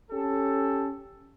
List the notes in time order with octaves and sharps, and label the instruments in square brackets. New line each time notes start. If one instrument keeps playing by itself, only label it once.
[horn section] C#4 G4 A4